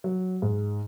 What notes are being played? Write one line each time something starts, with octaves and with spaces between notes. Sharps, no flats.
F#3
G#2